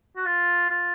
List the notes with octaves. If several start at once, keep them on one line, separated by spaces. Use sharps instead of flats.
F#4
F4
F4